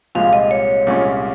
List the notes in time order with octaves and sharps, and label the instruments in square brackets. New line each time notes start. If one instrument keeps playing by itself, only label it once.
[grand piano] C2 A#2 F3 G#3 [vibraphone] F5
[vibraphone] D#5
C#5
[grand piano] C2 A#2 G#3 C#4 F4